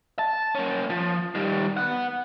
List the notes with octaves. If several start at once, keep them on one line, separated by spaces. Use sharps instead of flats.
A5
A#3 C#4
F3
D#3 G3
B3 F#5